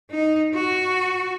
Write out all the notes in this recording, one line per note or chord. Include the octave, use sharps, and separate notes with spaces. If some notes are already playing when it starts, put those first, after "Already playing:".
D#4
F#4